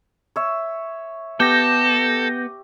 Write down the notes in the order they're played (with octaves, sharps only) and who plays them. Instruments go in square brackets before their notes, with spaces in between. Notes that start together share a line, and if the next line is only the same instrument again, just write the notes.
[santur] C#5 E5
[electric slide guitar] B3 [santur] G4 [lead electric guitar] A4 [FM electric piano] G6 A#6